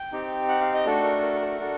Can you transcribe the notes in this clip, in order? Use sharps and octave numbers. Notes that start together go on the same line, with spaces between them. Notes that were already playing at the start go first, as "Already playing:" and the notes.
Already playing: G5
C4 D#4 G4
F#5
F5
D#5
A3 D4 F#4 A4
A#4
A#4
A#4
A4
A#4
D4 F#4 A4